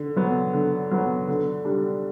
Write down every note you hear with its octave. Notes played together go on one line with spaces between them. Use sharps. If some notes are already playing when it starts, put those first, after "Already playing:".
Already playing: D3
F#3 B3
D3
F#3 B3
D3
G3 D4